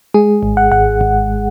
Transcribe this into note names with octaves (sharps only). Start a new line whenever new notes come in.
G#3 G#4
G#1
F#5
G#1 F#5
G#1